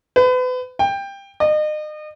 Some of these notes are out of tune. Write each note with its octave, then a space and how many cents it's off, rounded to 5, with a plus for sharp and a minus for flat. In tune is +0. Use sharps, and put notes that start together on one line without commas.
B4 +35
G5 +15
D#5 -35